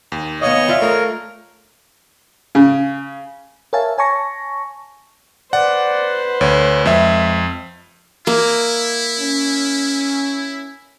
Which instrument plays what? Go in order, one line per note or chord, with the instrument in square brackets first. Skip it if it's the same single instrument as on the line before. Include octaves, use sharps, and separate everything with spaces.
[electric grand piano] D#2
[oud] B3 F5 [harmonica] C#5 [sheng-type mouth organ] D#5
[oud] F4 D5 E5
[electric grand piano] A3 A#5 [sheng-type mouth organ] A#4
[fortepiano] C#3
[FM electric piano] A#4 C#5 E5 F5 G#5 A5
C#5 G#5 A5 C#6 A#6
[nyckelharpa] B4 C5 [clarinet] D5 [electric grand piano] F#5
[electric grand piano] D2 [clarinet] C#5
[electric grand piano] F2 E5 [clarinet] G#3
[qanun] A#3 [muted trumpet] E4
[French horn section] C#4